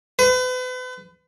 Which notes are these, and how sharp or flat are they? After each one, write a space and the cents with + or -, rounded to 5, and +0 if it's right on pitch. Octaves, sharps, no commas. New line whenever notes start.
B4 +40